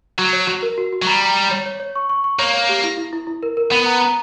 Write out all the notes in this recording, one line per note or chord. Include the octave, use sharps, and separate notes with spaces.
F#3 F#4
C#5
F#4
A#4
F#4
F#4
F#3
G3 A#5
A#5
A#5
C#5
C#5
C#5
C#6
C#6
C#6
A#3 C#5
C#5
G4
E4
E4
E4
E4
A#4
A#4
B3 F#5
A#5
A#5